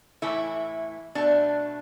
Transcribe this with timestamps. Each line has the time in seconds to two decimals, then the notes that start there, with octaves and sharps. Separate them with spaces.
0.22 A2 E3 A3 E4
1.15 B2 A3 D4